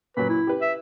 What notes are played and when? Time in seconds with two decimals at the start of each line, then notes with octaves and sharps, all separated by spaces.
0.17 A#2 F#3 B4
0.29 E4
0.47 G4 B4
0.62 E5